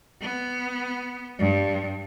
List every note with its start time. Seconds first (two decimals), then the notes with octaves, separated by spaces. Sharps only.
0.21 B3
1.39 G2